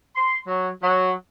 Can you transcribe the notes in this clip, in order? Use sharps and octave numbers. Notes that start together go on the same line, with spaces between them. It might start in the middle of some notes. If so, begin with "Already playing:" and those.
C6
F#3
F#3